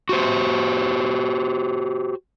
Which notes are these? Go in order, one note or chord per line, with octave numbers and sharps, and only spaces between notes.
F#4 G4 C5